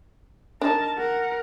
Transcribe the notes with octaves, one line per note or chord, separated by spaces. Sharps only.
D4 D#4 A#4 A5
A#4 F#5